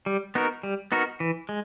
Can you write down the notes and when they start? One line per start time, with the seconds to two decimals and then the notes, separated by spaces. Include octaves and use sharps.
0.06 G3
0.35 B3 D#4 F#4 A#4
0.63 G3
0.92 B3 D#4 F#4 A#4
1.20 E3
1.49 G#3